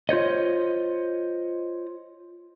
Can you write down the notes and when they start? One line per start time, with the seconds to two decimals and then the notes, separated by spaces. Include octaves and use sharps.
0.09 F4 C5 C#5 D#5